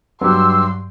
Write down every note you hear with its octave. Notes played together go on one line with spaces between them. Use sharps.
G2 F#3 F#4 G4 C6 E6